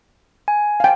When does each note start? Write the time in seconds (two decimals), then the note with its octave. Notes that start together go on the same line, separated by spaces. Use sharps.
0.48 G#5
0.80 F5 G5